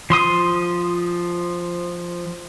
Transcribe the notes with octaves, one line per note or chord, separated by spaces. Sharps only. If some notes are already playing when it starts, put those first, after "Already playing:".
F3 C6 D#6